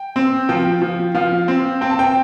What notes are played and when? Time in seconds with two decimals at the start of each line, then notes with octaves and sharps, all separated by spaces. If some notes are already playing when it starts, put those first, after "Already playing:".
Already playing: G5
0.16 C4
0.49 F3 G5
0.82 F3
1.15 F3 F5
1.48 C4
1.81 C4 G5
1.90 A5
1.99 G5